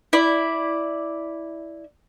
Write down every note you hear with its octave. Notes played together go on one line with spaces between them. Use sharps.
E4 D5